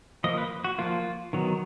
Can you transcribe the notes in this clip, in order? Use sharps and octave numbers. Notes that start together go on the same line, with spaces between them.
F3 A#3 D#5
B4
F#4
F3 A#3 F4
D#3 F#3 B3